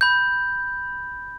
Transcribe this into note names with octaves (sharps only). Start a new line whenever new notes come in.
B5 G6